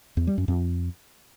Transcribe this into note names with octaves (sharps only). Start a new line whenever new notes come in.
E2
G3
F#2
F2